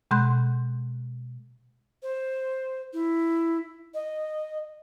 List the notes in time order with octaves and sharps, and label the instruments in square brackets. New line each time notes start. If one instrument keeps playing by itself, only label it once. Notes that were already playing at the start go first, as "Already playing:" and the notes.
[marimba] B2 G#3 C6 F#6 G6
[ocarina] C5
E4
D#5